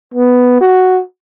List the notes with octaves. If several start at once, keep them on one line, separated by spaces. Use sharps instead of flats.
B3
F#4